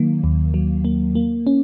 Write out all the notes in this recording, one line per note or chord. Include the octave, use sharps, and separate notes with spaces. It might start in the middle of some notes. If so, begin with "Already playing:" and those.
Already playing: D#3 F#3 A#3
D#2
F#3
A#3
A#3
C#4